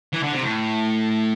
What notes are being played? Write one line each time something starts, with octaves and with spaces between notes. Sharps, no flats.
E3
D3
C3
A2